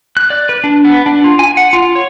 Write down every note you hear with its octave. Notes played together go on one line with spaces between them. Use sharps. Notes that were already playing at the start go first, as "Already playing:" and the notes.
F#6
D5
B4
D4
B3
D4
F4
G#5
F#5
F4
C#5